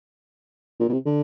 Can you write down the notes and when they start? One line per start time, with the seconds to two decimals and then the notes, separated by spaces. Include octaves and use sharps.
0.80 A#2
0.89 B2
0.93 C3
1.06 D3